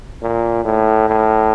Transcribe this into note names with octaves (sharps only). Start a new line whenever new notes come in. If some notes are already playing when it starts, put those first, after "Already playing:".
A#2
A2
A2